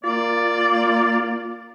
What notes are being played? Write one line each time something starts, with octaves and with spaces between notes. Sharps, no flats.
A#3 F4 D5